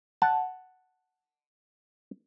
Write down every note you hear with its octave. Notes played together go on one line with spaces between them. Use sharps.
F#5 A5